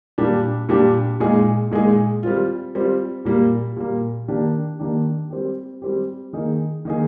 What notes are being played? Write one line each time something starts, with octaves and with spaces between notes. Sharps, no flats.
A#2 G3 D4 G4
A#2 G3 D4 G4
A#2 G#3 D#4 G#4
A#2 G#3 D#4 G#4
G3 C4 F4
G3 C4 F4
A#2 G3 A#3
A#2 G3 A#3
D#3 A#3 D4 G4
D#3 A#3 D4 G4
G3 C4 G4
G3 C4 G4
D#3 A#3 D#4 G#4
D#3 A#3 D#4 G#4